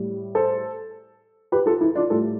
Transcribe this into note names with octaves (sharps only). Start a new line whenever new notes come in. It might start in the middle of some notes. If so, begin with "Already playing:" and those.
Already playing: A2 G3
A4 C5
G4 B4
F4 A4
E4
D4 F4
A2 G3 F4 A4